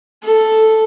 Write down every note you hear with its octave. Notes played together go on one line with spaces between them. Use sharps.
A4